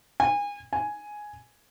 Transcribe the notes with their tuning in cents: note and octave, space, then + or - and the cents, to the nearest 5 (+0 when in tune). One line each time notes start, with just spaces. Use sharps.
G#5 -30
G#5 +5